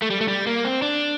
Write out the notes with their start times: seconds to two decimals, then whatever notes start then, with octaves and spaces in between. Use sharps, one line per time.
0.02 A3
0.10 G3
0.21 A3
0.28 G3
0.47 A#3
0.65 C4
0.82 D4